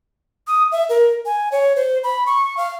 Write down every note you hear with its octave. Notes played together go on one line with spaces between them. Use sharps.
D#6
E5
A#4
G#5
C#5
C5
B5
C#6
F5